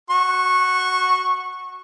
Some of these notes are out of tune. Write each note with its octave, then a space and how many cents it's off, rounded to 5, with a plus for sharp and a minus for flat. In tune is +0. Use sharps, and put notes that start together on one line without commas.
F#4 +0 C#6 -15